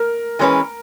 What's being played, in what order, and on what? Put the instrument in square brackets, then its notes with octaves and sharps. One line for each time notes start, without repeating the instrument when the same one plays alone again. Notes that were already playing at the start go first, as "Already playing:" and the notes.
Already playing: [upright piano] A#4
[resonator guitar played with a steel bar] E3 G#3 C#4 G4 B4